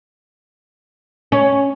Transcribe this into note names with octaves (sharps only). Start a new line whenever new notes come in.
C#4